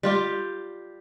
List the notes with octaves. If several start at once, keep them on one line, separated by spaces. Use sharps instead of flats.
G3 F4 G4